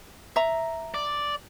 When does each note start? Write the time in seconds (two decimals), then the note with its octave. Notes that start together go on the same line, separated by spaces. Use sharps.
0.36 E5 A#5
0.94 D5